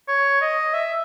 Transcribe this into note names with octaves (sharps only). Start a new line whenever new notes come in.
C#5
D#5
E5